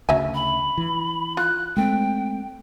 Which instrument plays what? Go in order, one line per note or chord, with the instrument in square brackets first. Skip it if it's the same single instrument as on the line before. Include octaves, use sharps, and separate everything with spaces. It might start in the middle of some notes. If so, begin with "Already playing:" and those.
[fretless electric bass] D2 C#3 [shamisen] F#3 E5 G#5
[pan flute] B5
[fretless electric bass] E3
[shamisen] F4 [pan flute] F#6
[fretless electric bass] G#3 A3 C4 [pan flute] G5